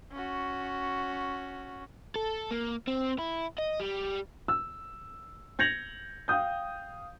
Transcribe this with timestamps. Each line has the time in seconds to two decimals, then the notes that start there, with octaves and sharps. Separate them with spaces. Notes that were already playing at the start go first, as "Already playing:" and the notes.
0.12 C#4 F#4
2.16 A4
2.51 A#3
2.87 C4
3.19 E4
3.59 D#5
3.80 G3
4.48 E6
5.59 G6 G#6 A#6 C#7 F7 F#7
6.28 F5 G5 D#6 G6